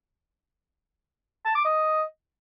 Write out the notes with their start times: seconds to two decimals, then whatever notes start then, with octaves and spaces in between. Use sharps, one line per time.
1.45 A5
1.55 D6
1.65 D#5